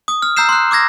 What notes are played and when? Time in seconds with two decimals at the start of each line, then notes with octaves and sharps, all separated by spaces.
0.08 D#6
0.22 F6
0.37 A#5 E6 G6 C7 E7
0.49 C6 F#6
0.71 D6 E6 G#6 A#6